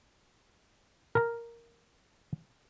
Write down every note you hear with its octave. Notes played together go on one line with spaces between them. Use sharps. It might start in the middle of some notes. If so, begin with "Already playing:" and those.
A#4 A#5